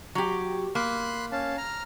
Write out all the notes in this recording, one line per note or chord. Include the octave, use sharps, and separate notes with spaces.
F#3 G4
A#3 B5 C6 F#6
C#4 F5 A5
A#5 F6